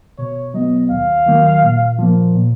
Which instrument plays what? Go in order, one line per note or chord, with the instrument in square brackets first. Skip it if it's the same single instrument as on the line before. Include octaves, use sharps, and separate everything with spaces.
[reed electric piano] B2 [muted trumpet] C#5
[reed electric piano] F#3 B3 [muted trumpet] D#5
[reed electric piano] D#2 [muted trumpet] F5
[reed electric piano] D#3 F#3 A#3
A#2
F3 A#3
A#2